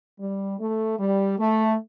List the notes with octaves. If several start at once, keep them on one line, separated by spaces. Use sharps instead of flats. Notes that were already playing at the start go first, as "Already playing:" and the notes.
G3
A3
G3
A3